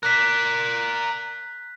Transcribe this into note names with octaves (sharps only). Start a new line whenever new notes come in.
A#4 D5 F#6 B6